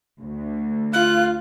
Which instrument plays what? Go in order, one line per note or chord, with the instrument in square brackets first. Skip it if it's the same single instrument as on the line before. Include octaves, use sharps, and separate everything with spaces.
[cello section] D2
[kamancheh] F4 [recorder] F#6